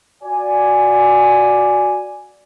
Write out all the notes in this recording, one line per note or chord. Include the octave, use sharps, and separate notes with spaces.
F#4 D5 G#5